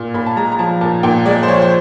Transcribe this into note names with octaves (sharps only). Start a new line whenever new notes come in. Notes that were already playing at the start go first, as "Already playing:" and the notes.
Already playing: A#2
A#2 B5
A5
G#3 A#5
A#5
F3 A5
A#2 A5
A#2 G5
G#3 D5
C5
F3 C#5
C5